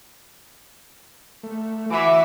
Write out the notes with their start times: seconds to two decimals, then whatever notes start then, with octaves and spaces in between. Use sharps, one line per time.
1.43 A3
1.91 E3 F#4 E5 D6